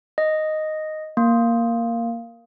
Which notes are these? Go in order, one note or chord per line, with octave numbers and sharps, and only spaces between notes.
D#5
A#3